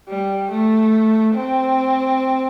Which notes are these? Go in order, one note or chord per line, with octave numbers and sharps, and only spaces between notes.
G3
A3
C4